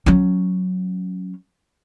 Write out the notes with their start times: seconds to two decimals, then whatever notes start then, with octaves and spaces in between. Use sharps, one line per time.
0.06 F#3 C#4